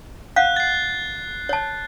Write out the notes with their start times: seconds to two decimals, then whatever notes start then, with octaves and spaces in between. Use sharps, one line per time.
0.36 F5 F#5 F#6 G6
0.56 A6 C7
1.49 C#5 A5